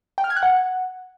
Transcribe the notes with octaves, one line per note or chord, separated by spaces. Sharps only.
G5
F6
G#6
F#6
F#5